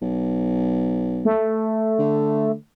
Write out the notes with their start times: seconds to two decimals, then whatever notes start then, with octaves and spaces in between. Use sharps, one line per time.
0.02 B1
1.25 A3
1.99 D3